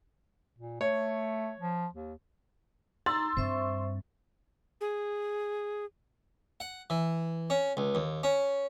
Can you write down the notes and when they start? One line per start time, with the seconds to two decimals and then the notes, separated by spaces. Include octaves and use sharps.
0.59 A#2
0.81 A3 C#5
1.59 F3
1.93 D#2
3.06 D#4 A#5 C6 E6 A6
3.37 G2 C4 C5 E5 C#6
4.81 G#4
6.60 F#5
6.90 E3
7.50 C#4
7.77 C#2
7.95 D#2
8.23 C#4